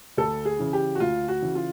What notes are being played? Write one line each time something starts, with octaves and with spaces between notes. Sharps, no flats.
D2 A4
G#4
C#3 E3
G4
F#4
D2 F4
F#4
C#3 E3
F4